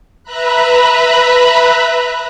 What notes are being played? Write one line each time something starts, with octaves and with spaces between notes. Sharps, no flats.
B4 E5 A#5 B5 F#6